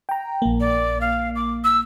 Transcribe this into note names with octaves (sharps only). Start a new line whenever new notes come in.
G5 A#5
A#1 A#3
D5
F5
D6
E6